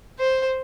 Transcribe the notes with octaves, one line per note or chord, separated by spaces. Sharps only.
C5